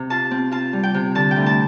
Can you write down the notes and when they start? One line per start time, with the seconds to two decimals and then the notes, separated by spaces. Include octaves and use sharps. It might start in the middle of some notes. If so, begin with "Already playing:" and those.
Already playing: C3
0.10 F4 A5
0.31 C4
0.51 F4 A5
0.73 G3
0.83 G5
0.94 C3
1.15 D3 A5
1.31 G5
1.36 D2
1.46 A5